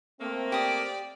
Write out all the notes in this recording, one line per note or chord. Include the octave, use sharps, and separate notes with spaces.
A3 A#3 C4
G4 D5 G5 D#6